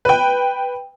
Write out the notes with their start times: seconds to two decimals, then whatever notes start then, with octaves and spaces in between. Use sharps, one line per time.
0.05 B4 G5